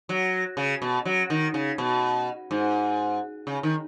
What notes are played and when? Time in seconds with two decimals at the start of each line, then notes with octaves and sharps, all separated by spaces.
0.09 F#3
0.57 C#3
0.82 B2
1.05 F#3
1.30 D#3
1.54 C#3
1.78 B2
2.51 G#2
3.47 C#3
3.63 D#3